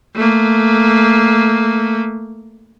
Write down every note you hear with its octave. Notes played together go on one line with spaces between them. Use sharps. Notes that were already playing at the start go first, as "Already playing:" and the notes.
A3 A#3